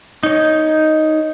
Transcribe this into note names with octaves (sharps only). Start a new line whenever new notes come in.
D#4 C#5